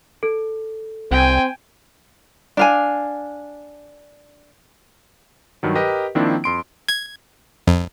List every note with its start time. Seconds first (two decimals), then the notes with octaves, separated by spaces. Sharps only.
0.23 A4
1.11 C2 C4 G5 G#5
2.57 D4 F5 G#5
5.63 G2 D#3 F#3
5.76 G4 A#4 B4 D#5
6.15 D#3 F3 A#3 C4 D4 E4
6.44 F2 C6 D7
6.88 G#6
7.67 F2